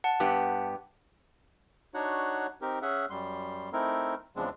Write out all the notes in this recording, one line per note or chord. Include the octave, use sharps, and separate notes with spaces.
F#5 A5
G2 B3 G4
D4 D#4 F#4 C#5 F#5
C4 D#4 G4 A#4
C#4 G#4 E5 F#5
F#2 G3 C6
A3 C4 D#4 E4 A#4
E2 C#3 F3 G#3 C4 D4